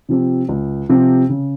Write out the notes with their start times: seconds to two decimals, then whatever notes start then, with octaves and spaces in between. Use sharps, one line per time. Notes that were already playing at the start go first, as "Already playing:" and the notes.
0.09 C3 F3 C4 G4
0.49 C#2
0.89 C3 F3 C4 G4
1.29 C#3